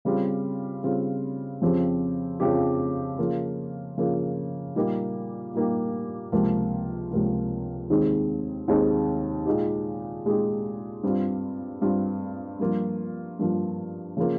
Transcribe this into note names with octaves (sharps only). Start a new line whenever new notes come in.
C#3 G3 C4 F4
C#3 G3 C4 F4
F2 C#3 F3 C4 G4
F2 C#3 F3 C4 G4
C#3 F3 A#3 F4
C#3 F3 A#3 F4
A#2 G3 A#3 D#4 G4
A#2 G3 A#3 D#4 G4
C#2 C3 F3 A#3 F4
C#2 C3 F3 A#3 F4
D#2 D#3 G#3 C4 D#4
D#2 D#3 G#3 C4 D#4
A#2 G#3 D#4 G4
A#2 G#3 D#4 G4
G2 G3 C4 F4
G2 G3 C4 F4
G2 F3 A#3 F4
G2 F3 A#3 F4
C#3 F3 A#3 F4